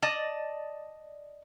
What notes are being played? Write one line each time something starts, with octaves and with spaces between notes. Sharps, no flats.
D5 D#5 A5